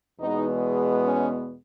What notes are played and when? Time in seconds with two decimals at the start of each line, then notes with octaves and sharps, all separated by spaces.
0.19 E2 B2 G#3 B3 D#4
1.04 C#4